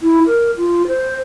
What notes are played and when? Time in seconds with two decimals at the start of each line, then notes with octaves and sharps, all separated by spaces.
0.02 E4
0.27 A#4
0.57 F4
0.87 C5